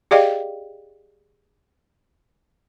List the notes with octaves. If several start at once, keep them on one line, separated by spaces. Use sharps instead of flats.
G4 G#4 D5 D#5 F5 G5